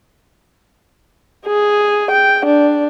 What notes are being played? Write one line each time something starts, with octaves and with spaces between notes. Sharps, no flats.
G#4
G5
D4